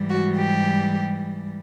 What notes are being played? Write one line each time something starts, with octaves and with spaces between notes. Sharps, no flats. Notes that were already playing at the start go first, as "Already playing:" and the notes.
Already playing: G#2 E3 G3
F#4
G4